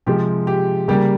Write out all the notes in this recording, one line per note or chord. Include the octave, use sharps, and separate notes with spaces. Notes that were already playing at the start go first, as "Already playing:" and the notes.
C3 F3 G#3 G4
G4
C#3 G3 A#3 G4